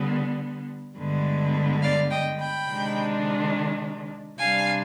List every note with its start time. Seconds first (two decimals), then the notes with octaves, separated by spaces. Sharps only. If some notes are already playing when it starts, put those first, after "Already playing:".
Already playing: D3 G3 B3
0.98 G2 D3 G#3 B3
1.83 D5 F5
2.11 D#5 G5
2.40 G5 B5
2.68 C3 D#3 G#3 D4
4.39 C3 G3 D4 F5 G#5